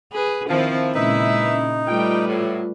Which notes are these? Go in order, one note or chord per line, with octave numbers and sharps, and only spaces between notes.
G#4 B4
D#3 F3 C4 E4 C5
A#2 C#3 G#3 C#4 D#4 E4 B4 E5
C#4
G3 A3 F4 B4 G5
A2 F#3